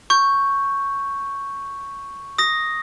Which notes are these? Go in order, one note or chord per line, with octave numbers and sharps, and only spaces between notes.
C#6 G6
D#6 A#6